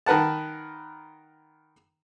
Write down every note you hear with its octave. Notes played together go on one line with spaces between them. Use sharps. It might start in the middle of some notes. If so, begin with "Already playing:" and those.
D#3 A#4 B4 F#5 A5